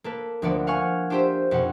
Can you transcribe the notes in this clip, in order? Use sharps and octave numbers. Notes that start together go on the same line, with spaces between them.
A#3 A4 B4
D2 F3 A#3 B3 D5 F#5
F5 F#5 G#5 C#6 F6
D4 F4 G4 C5 E5
F2 B2 D#4 F#5